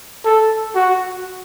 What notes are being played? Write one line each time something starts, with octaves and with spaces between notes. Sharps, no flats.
A4
F#4